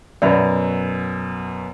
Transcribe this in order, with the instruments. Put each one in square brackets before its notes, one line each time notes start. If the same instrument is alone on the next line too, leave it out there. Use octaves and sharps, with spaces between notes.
[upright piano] F#2 B2 [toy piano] D5 E5 B5